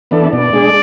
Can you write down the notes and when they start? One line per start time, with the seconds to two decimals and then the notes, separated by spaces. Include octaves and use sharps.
0.11 E3 B3 D4 A4
0.32 B2 D5
0.53 G#3 D4 G#4